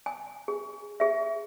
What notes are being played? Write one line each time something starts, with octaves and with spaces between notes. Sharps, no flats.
G#5
G#4
G#4 E5